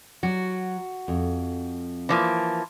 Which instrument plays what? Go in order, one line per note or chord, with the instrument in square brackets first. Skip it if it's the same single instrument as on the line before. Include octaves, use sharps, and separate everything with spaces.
[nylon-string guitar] F#3 [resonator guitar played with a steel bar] F#4
[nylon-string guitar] F2
[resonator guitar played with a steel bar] E3 F3 A#3